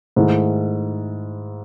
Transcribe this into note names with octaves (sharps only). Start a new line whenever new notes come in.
G#2 D#3 A3 E4